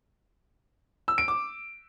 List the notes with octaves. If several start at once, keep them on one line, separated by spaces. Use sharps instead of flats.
E6
D7
D6